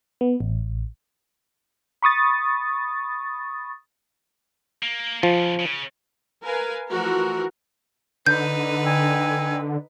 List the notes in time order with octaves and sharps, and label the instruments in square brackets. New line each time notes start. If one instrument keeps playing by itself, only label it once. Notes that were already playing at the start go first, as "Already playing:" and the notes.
[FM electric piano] B3
A1
B5 C#6 D#6 A6
[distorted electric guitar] A#3
[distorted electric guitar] F2 C#3 [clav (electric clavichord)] F3
[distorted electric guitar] C#3
[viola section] A#4 B4 F5 G#5
E3 F3 A3 F#4 A#4
[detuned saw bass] D3 [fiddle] D#4 B4 [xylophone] G6
[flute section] G5 G#5 E6